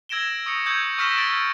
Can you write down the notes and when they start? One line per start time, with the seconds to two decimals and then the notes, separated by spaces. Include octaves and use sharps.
0.09 E6 G#6 A#6 D7 E7 G7
0.46 C#6 D#6 G6 A#6 C#7
0.66 C#6 D#6 E6 G6 G#6 C#7
0.98 C#6 E6 F6 A#6 B6 E7
1.18 A6 D7 G7